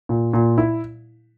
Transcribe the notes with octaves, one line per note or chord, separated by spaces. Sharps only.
A#2
A#2
E4